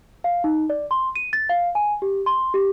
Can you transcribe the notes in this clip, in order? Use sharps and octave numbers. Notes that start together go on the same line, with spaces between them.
F5
D#4
D5
C6
D#7
A6
F5
G#5
G4
C6
G4